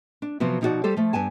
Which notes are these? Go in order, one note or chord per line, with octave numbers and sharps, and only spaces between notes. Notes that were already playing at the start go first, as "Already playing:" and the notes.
D4
C3 F3 F#3 B3
B2 F3 D#4 E4 F#4 D5
G3 G4 A4 C5
F3 A3
G2 B3 G#5 A5